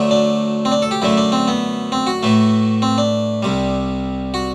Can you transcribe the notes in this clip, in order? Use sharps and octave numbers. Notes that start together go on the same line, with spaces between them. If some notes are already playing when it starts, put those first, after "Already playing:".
Already playing: D2 D3 F#3 A3
D4
C4
D4
A4
G4
F#2 D3 A3 E4
D4
C4
B3
C4
F#4
A2 E3 A3
C4
D4
C2 C3 G3
F#4